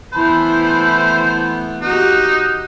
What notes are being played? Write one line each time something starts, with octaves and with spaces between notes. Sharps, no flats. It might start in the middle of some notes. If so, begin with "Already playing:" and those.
E3 A3 B3 E4 C5 A5 B5
D#4 F#4 G4 F#6